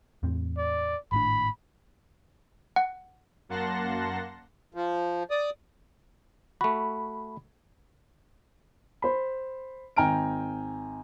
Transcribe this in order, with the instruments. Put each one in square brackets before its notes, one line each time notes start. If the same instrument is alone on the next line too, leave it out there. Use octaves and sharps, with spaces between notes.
[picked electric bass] E2 A2 C4
[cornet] D5
[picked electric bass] G#1 A2 D4 [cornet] B5
[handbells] F#5
[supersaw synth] F#2 A#3 F#5 A5 C6 A#6
[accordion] F3
D5 D#6
[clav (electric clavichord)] A3 F#4 [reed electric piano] B5
[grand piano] C5 B5
G#1 G5 G#5 A#5 F6 D7